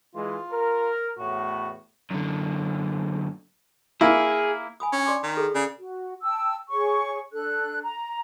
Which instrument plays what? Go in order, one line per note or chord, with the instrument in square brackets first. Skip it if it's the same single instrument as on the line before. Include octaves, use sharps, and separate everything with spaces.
[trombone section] E3 G#3 [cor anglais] F4
[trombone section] A#4
[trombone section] E2 A2 [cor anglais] F#4
[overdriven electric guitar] F#2 D3
[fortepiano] A#3 E4 [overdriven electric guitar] G#4
[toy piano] G#5 B5 D#6
[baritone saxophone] C#4 [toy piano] D4
[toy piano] D5 C6 D6
[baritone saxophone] D#3
[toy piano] G#4 A4
[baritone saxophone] C#3 [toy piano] D5
[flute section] F#4
G5 A5 E6
G#4 C#5 C#6
D4 A4 F#6
A#5